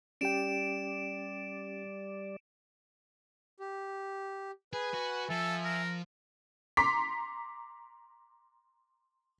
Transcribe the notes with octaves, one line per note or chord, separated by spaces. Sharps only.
G3 C#4 G4 D5 G5 D7 E7
G4
G#4 B4 G#5
F#4
F3 A4 E5 G#5
A#4
A#5 C6 D6 B6